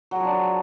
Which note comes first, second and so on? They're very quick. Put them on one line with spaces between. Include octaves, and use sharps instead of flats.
F#3 G#4 F3 D4